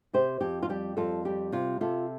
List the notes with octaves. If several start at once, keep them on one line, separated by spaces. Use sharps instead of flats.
C3 G4 C5
F2 G4
F4
G3 G4
F2 F4 A4
G3 G4
C3 F4
C3 F4 A4